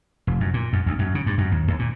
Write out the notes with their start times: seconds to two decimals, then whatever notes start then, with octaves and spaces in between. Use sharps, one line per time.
0.27 F1
0.40 F#2
0.54 A#2
0.73 F#2
0.86 D2
0.99 F#2
1.15 C#3
1.26 G2
1.38 F#2
1.52 D#2
1.68 D#2
1.79 A#2